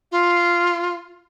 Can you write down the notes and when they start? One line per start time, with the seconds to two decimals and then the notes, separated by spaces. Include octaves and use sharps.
0.11 F4